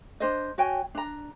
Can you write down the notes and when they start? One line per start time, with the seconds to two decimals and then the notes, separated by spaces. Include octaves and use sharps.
0.20 D4 C5 D#5
0.58 F#4 C#5 G5 G#5
0.95 D4 A#5